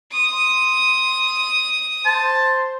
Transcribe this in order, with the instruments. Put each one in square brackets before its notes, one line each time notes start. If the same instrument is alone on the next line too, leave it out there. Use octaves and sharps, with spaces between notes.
[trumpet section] C6 [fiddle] D#6
[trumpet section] C5 [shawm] A5